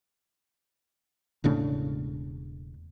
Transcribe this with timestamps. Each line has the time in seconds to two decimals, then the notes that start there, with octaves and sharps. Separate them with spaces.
1.44 E1 A2 C#3 D4